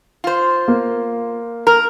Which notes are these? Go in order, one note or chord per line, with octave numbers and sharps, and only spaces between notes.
F4 C5
A#3
A#4